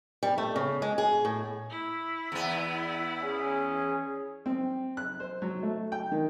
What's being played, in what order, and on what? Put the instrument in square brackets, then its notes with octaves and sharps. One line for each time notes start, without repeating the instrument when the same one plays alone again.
[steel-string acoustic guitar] G3
A3
C#3
G#3
G#4
A2
[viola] E4
[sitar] E2 B3
[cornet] C#4 [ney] G#4
[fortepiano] C4
F#6
C5
F#3
A3
G5
D#3